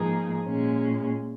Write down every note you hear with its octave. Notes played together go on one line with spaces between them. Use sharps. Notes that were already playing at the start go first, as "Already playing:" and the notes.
Already playing: G#2 F3 A#3 D#4 G#4
A#2 G#3 C#4